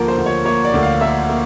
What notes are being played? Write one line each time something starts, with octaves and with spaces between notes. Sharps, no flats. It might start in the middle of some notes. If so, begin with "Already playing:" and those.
Already playing: D2 F3 A#3 A#4
C5
D2
C#5
A#3 C#5
D5
D2
F5
A#3 E5
A#3